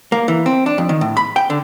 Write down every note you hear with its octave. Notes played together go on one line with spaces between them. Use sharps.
A#3
E3
C4
D4
F2
D#3
A2
B5
G5
D3